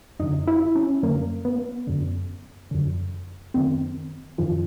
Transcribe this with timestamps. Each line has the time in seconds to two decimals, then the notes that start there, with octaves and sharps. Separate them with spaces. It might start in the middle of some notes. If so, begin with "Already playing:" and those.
0.19 F#2 D3 D#4
0.47 E4
0.75 C#4
1.03 F#2 D3 A#3
1.45 B3
1.87 F#2 D3
2.71 F#2 D3
3.54 F#2 D#3 C4
4.38 F#2 D#3 F3